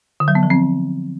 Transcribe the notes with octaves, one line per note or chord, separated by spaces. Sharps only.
D3
F#3
B3
F3
C4